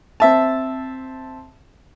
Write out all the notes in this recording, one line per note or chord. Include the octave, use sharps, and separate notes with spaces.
C4 E5 A5